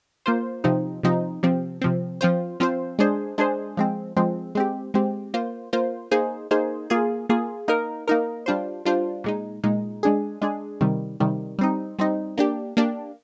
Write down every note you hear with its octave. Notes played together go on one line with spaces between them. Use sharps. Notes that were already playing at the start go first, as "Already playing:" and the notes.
A#3 F4 C5
C3 F3 C4 D#4
C3 F3 C4 D#4
C3 F3 C4
C3 F3 C4
F3 C4 F4 C5
F3 C4 F4 C5
G#3 D4 G#4 C5
G#3 D4 G#4 C5
F3 G#3 C4
F3 G#3 C4
G#3 C4 G4
G#3 C4 G4
A#3 F4 C5
A#3 F4 C5
A#3 D#4 G#4 C5
A#3 D#4 G#4 C5
A#3 F4 G#4
A#3 F4 G#4
A#3 D#4 A#4
A#3 D#4 A#4
G3 D4 F4 C5
G3 D4 F4 C5
A#2 G#3 D#4
A#2 G#3 D#4
G#3 D4 G#4
G#3 D4 G#4
C3 D#3 G3
C3 D#3 G3
G3 C4 D#4
G3 C4 D#4
A#3 D4 G4
A#3 D4 G4